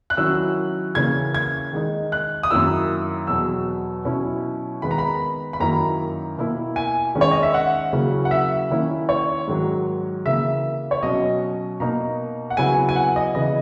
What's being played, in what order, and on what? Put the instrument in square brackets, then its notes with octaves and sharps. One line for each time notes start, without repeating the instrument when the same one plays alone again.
[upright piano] F#6
D#3 F#3 C#4 E4 E6
C#3 E3 A#3 C#4 G#6
G#6
D#3 G#3 D#4
F#6
D#6
F#2 D#3 A#3 E4 E6
E2 B2 F#3 E6
B2 F#3 C#4 E4
D#3 G#3 B3 B5
A#5
B5
B5
F#2 D#3 A#3 C#4 E4 A#5
B2 A#3 E4
G#5
D#3 G#3 C#4
C#5
D#5
E5
F#5
C#3 F#3 A#3 C#4 E4
F#5
E5
D#3 A#3 C#4 E4
C#5
G#2 D#3 F#3
C#3 E3 A#3 E5
C#5
B2 F#3 C#4 D#5
B2 A#3 D#4 A#5
F#5
C#3 F#3 B3 E4 G#5
G#5
F#5
D#5
C#3 E3 B3 D#5